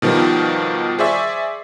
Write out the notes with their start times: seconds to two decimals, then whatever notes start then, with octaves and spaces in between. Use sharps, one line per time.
0.02 B2 D#3 F3 G3
0.99 G#4 C5 D5 E5 C#6